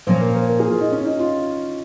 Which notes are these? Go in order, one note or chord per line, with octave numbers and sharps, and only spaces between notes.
A#2 F3 A#3 C#4 C5
A#4
C5
A#4
G#4
F4
D#4
C#4
D#4
F4